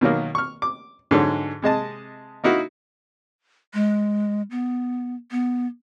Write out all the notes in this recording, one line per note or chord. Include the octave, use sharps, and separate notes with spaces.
B2 D#3 F#3 A#3
C#6 F6
D6
G#2 D3 F#3 G#3
C3 G#3 D#5 A5
A#3 D#4 E4 F#4
G#3
B3
B3